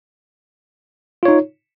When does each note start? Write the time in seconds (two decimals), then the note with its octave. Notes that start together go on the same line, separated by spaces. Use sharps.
1.23 F4
1.25 C#5
1.28 D#4